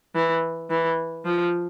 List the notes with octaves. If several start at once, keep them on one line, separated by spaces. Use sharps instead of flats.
E3
E3
F3